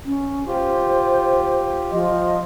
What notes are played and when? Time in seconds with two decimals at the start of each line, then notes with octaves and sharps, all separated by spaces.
0.05 C#4
0.47 F4 G4 C5
1.91 F3 D#5